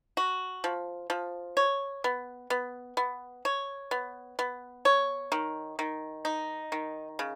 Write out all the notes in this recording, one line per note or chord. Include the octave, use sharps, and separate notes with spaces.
F#4
F3
F3
C#5
B3
B3
B3
C#5
B3
B3
C#5
D#3
D#3
D#4
D#3
C#3